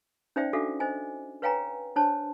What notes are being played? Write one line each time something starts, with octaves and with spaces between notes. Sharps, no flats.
C#4 D#4 C5 D5 E5 G5
D4 F#4 A4 E5 F5 D6
C5 D#5 G#5
B4 C#5 F5 G5 G#5 A#5
D4 C5 C#5 A5